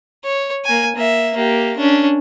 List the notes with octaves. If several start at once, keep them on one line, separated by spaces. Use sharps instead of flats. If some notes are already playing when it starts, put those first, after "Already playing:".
C#5
A#3 G#5
A#3 E5
A#3 G4
C#4 D4